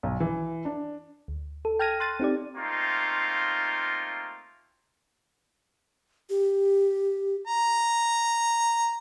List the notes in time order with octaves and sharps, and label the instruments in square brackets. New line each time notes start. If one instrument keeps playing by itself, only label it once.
[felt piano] B1
E3
D4
[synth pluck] D2
A4
G5 A5 F6 G#6 A#6 D#7
C6 F#6 A6 D#7
C4 D#4 G4 D5
[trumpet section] A3 A#3 C4 D#4 F4
[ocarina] G4
[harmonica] A#5